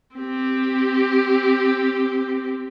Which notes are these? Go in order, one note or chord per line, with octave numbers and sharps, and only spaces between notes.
C4 G4